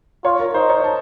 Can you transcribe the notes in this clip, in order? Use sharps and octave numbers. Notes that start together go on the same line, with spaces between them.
F4 C#5
A#4
D#4 C5
C#5
A5